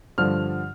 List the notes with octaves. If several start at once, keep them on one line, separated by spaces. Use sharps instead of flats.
G2 D3 F3 F6